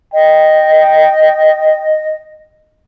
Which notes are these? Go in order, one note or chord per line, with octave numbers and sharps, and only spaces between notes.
D#5 G5